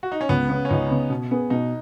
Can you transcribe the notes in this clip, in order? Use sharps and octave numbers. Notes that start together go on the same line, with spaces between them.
F#4
D#4
C#4
C#2 B3
C#3 B3
C#4
C#2 D#4
C#3 B3
B2
B3 G#4
B2 D#4